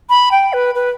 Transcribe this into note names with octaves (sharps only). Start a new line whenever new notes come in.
B5
G5
B4
B4